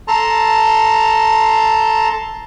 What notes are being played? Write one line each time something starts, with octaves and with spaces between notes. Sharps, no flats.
A4 A5 A#5 C6